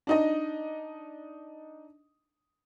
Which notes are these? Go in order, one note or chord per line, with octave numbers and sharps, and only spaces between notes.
D4 D#4 D#5